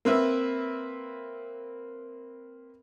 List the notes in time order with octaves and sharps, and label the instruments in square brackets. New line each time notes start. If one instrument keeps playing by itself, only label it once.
[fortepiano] A#3 C4 B4 E5